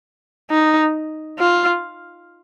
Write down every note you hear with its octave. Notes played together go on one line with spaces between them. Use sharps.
D#4
F4